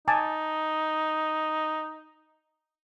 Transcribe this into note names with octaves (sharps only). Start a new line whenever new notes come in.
D#4 G#5 A5 D6